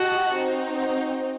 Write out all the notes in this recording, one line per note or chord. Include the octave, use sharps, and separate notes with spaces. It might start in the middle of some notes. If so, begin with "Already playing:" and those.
Already playing: F#4 G4 D#5 F#5 A5
C4 D#4 F#4